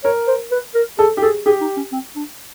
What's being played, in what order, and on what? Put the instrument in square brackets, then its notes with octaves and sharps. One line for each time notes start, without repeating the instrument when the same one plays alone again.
[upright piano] A#4 [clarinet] C#5
[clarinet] C5
B4
A#4
[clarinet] G#4 [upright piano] A4
[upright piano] G4
[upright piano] G#4 [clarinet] A4
[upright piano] G4 [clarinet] G#4
[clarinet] D#4
C#4
C4
D4